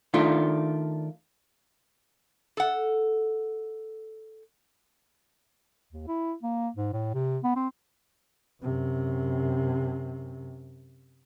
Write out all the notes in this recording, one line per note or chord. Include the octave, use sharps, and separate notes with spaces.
D#3 A3 D4 F4
A4 F#5
D#2
E4
A#3
G#2
A2
C3
B3
C4
F#2 C3